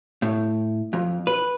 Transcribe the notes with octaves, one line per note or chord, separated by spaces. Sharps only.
A2
F2
B4